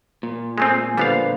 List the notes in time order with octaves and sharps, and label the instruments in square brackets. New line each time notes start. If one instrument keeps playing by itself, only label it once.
[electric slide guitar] A#2
[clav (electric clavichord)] G#3 A3 C4 [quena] G#5
[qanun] D3 F3 [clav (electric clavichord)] G3 B3 F5 [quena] B4